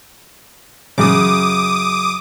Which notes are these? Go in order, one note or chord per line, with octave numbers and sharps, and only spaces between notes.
F#2 C#3 D6 D#6